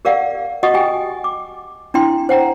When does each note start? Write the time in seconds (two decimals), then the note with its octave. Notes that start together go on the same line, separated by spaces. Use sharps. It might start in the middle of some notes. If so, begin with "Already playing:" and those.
0.05 G4 A#4 D5 F5 F#5
0.63 F#4 D#5 F#5 C#6 D#6
0.74 G4 G5 G#5
1.24 D6
1.94 D4 E4 G5 C6
2.29 C5 F#5 G5 A#5